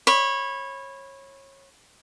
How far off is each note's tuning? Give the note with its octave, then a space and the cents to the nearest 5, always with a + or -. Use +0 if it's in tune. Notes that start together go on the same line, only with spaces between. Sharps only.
C#5 -25 B5 +0